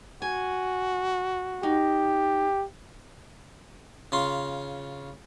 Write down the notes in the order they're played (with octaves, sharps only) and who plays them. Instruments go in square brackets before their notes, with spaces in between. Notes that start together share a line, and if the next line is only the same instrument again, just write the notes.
[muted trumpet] F#4 [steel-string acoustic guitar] G#5
[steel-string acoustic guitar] D#4 [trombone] G4
[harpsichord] C#3 F4 C6